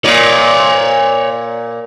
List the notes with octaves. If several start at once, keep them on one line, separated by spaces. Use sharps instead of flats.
A#2 C#5 D5